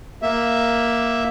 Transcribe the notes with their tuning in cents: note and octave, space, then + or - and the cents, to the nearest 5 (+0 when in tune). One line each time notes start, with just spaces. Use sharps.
A#3 +5 E5 +0